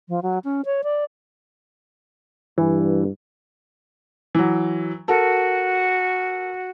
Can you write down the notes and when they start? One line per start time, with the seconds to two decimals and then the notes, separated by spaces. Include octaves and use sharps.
0.09 F3
0.23 F#3
0.44 C#4
0.65 C#5
0.84 D5
2.58 G2 E3
4.35 E3 F#3
5.08 F#4 A4 A#4